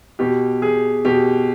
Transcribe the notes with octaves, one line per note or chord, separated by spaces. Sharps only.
B2 G4
G#4
B2 G4